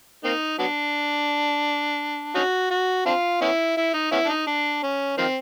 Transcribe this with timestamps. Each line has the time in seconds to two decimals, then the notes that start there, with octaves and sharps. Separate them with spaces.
0.24 A#3 C4 D#4
0.59 F#3 B3 D4
2.35 C#4 D#4 F#4
2.71 F#4
3.06 C4 D4 F4
3.41 B3 C#4 E4
3.77 E4
3.94 D#4
4.12 B3 C#4 E4
4.25 D4
4.29 D#4
4.47 D4
4.83 C#4
5.18 D#3 F3 C4